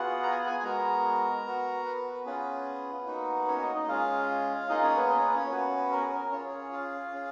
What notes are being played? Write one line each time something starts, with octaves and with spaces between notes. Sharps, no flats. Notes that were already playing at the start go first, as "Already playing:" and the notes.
Already playing: B3 F4 F#4 G#4 F#5
A#5
G#5
F#5
G#4 G#5
G#5
G#3 B3 F#4 A#4 A#5
B3 F#4
B3 B4
B3 C#4 F4 G#4 B4
A#3 D#4 F#4
C#4 C#5
D#4 D#5
D#4 D#5
D#5
G#3 C#4 F4 G#4 F5
A#3 D#4 F4 G#4 D#5
C#4 C#5
B3 B4
D#5
C#5
B4
C#4 C#5
B3 C#4 F#4 B4
A#4
G#4
A#4
C#4 F4 G#4 C#5
F4 F5
C#4 G#4